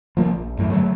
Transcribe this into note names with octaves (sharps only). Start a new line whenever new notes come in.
F3 A#3 D4
A#1
F#2 A2 E3
D3 F#3 G#3 A3